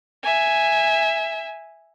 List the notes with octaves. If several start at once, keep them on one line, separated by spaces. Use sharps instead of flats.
E5 G#5